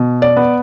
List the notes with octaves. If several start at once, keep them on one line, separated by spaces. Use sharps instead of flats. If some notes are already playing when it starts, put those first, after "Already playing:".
Already playing: B2
D5
B3